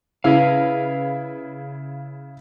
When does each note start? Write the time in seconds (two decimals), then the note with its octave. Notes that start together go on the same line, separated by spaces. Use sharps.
0.24 C#3 E4 B4 F5